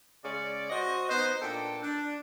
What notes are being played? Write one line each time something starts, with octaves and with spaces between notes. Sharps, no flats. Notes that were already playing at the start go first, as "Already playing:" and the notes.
C#3 G#3 C#4 D5
F#4 C5 D#5
B3 D#4 B4 C5
A#2 D4 A4 G5
D4